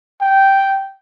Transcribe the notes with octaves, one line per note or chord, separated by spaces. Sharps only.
G5